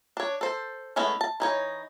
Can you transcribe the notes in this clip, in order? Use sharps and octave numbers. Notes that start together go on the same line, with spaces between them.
D4 C#5
A4 C5
G#3 A3 B3 C#4 E4
A5
E3 D#4 C#5